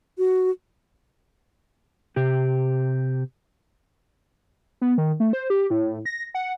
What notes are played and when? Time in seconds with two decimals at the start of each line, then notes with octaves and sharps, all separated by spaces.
0.18 F#4
2.16 C3 G4
4.81 B3
4.98 D#3
5.20 A3
5.33 C5
5.50 G4
5.70 A2
6.05 A#6
6.35 F#5